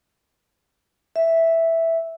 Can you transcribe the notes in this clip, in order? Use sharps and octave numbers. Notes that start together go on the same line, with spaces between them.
E5